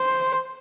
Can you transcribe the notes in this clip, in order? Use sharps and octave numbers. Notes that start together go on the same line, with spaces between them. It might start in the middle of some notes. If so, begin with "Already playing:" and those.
Already playing: C5